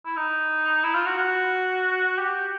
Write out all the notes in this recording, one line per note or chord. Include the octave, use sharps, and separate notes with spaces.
E4
D#4
E4
F4
F#4
F#4
G4